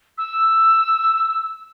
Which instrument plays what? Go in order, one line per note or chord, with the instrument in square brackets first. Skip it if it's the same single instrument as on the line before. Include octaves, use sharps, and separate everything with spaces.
[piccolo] E6